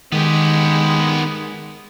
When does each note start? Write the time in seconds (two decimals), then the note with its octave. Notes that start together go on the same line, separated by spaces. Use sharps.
0.12 D#3 G#3 B3 G4